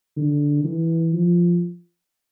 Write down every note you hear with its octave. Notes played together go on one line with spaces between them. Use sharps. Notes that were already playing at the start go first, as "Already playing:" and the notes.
D3
E3
F3